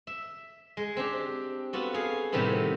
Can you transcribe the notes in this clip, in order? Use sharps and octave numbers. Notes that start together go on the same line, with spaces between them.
E5
G#3
C4 D4 G4
B3 F4 F#4 A4
G#4 F5
A2 C3 D#3 G3 B3 E4